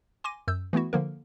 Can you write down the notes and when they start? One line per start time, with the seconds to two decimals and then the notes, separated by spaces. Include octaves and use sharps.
0.24 G#5 C6 D6 A#6 D#7
0.48 F#2 E6 G6
0.73 E3 A3 B3 E4 F#4
0.93 D3 F3 A#3 A#4